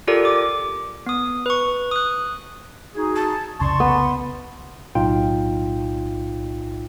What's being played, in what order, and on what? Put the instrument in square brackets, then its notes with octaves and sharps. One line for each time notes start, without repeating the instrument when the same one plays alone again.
[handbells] F4 G4 A4 A#4 D5
D6
B3 D#6
B4 C#6
D#6 F#6
[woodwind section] D#4 F#4 G#4
[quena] A5
[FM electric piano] C2 F2 C#3 [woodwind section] D5 A5 C#6 [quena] C6
[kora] B3
[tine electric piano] B1 A2 D#4 F4 G5